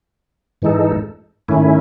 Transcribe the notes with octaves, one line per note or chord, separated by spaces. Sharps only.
G#2 E3 G#3 D#4 A4
G#2 D#3 A3 C#4 E4